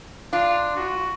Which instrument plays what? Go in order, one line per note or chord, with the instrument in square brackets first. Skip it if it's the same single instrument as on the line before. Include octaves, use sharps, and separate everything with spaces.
[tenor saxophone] D4 [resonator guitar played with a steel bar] F4
[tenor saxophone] F#4